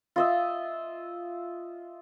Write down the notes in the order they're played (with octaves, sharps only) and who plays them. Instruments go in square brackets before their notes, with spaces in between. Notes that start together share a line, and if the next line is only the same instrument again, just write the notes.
[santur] F4 D#5 E5